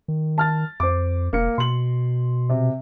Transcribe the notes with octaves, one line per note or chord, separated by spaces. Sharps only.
D#3
A5 F6 A6
F2 C5 D6
E1 A#3 C#7
B2 C6 F#7
C3